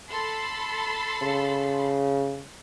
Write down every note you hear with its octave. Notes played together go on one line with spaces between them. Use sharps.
A4 B5 C6
C#3